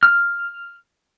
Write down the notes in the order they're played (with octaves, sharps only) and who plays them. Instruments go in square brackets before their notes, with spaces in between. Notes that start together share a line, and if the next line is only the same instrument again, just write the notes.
[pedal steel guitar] F6